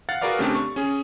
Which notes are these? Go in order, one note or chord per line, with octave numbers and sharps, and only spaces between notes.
F5 F#5 A6
F#4 G#4 A#4 B4 D5 F5
C#3 A3 C4 D4 G4
C#6
C#4 G#4